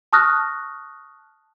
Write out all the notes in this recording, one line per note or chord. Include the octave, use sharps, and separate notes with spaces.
A5 C#6 D#6 F6 F#6 A#6